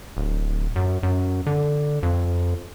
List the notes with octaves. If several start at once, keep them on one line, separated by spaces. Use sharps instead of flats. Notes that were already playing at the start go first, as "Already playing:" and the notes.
D1
F#2
F#2
D3
F2